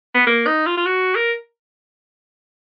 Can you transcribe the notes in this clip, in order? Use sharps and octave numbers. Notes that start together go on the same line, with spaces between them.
B3
A#3
D#4
F4
F4
F#4
A#4